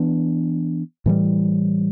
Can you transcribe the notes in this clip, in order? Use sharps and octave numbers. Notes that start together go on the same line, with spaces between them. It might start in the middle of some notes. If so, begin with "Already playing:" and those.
Already playing: E3 B3 D4
A2 E3 G3